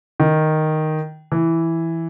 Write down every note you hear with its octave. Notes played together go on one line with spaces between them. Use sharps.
D#3
E3